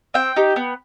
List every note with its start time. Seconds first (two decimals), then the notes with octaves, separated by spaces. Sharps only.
0.14 C4 G5
0.36 D#4 G4
0.56 B3